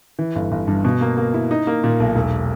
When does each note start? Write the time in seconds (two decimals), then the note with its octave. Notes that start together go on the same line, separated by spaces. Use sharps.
0.19 E3
0.36 G1
0.52 G1
0.67 G2
0.85 B2
1.01 A#3
1.17 A#3
1.34 E4
1.51 D#4
1.67 A#3
1.84 A#2
2.00 B1
2.15 E1